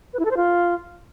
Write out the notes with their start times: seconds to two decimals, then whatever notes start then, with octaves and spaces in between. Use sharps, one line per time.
0.13 B4
0.19 E4
0.25 A4
0.31 C5
0.37 F4